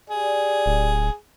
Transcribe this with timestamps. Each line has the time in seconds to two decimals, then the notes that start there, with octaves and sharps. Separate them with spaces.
0.10 G4 G#4 D5
0.66 D1